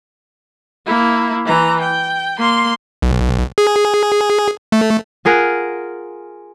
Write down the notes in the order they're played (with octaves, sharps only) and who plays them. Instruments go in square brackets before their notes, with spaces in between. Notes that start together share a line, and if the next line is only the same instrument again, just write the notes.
[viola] A#3 E4
E3 A#5
G5
A#3 C6
[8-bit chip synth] B1
G#4
A3
[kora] F4 G#4 A#4 F#5